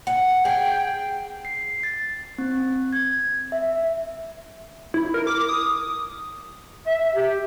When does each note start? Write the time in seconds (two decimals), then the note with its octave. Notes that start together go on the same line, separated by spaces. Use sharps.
0.07 F#5
0.45 G#4 G5
1.45 C7
1.83 A6
2.38 C4
2.92 G#6
3.52 E5
4.94 E4
5.14 A#4
5.27 D6
5.49 D#6
6.87 E5
7.15 G4